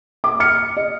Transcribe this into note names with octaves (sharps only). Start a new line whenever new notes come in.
D6
F6 C#7
D#5